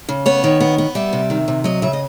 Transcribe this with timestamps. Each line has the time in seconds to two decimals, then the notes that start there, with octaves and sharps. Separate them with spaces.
0.09 C#3
0.26 B3 C#5
0.44 D#3
0.60 B3
0.78 B3
0.95 G3 E5
1.13 C3
1.30 D#3
1.48 C3
1.64 F#3 D#5
1.82 C#3 E5
1.93 D#5